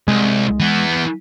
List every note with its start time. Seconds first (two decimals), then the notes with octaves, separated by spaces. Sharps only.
0.08 C2 G#3
0.60 E3 B3